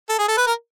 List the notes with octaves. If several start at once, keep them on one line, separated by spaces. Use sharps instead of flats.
A4
G#4
A4
B4
A#4